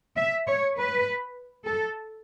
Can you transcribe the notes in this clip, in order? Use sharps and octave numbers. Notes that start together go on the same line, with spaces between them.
E5
C#5
B4
A4